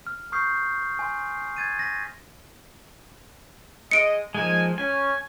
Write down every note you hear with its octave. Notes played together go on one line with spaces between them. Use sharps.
F6
C#6 D#6 F6 G6 C7
G#5 C6
C7
G#6 A6 D#7
A#6 B6
G#3 D#5 C#7 D7
F3 G#3 A#3 D#4 G#5
C#4 G#5